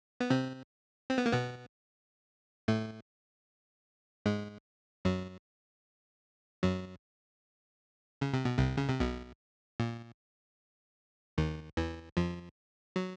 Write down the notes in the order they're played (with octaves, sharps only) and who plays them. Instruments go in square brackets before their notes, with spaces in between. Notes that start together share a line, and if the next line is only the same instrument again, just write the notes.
[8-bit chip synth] B3
C3 C4
C4
B3
A#3
B2 B3
A2 A3
G#2 G#3
F#2 F#3
F#2 F#3
C#3
C3
B2
C2 C3
C#3
C3
B1 B2
A#2
D#2 D#3
E2 E3
F2 F3
F#3